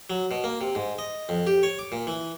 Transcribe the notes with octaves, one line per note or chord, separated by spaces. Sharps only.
F#3
B2
A#3
C3
G#2
D#5
F2
G4
C#5
D6
A#2
E3